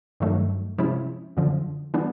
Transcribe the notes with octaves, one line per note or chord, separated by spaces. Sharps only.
G2 D#3 F#3 A3
C3 F3 G#3 C#4 E4
F#2 D3 F3
E3 G3 B3 D4